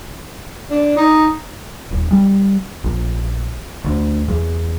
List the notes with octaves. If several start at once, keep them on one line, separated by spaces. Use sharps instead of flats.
D4
D#4
D#1
G3
A#1
D2
E2